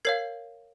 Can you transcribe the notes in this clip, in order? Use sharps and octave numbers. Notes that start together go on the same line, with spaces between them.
A#4 C#5 F5 G#6 C7